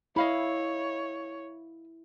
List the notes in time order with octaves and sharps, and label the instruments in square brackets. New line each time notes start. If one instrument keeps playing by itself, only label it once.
[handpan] E4 [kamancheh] C#5 [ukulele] D#5 F5 B5